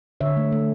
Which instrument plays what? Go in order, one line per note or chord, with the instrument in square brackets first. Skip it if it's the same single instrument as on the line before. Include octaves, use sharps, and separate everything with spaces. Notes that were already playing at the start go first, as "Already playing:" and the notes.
[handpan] D3 C#5 E5
A3
A3